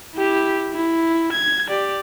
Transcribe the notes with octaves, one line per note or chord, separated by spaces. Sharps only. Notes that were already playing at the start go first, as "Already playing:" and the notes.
E4 G4
E4
G#6
G4 D5